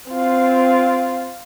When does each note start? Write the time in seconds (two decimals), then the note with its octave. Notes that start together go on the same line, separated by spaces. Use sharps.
0.11 C4 F4